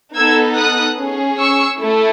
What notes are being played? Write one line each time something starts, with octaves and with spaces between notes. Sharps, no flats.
B3 D#4 A4 E6 G#6
D#6 F#6
C#4 G#4
C#6 E6
A3 E4 A4